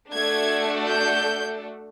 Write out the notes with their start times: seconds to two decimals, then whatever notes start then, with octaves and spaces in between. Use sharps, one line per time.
0.13 A3 D4 F#4 A4 G#6
0.90 G6